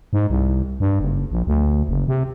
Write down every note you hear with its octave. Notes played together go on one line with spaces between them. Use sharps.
G#2
C2
G2
F#1
A#1
D2
F#1
C3